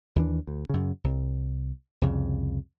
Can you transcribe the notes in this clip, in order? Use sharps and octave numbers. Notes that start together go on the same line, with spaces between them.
D#2 E3 D4
D2
F#2 C#3
C2
C2 F2 C#3